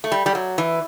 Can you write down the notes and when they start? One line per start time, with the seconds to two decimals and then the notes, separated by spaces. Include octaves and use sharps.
0.04 A3
0.12 G3
0.26 G3
0.35 F#3
0.58 E3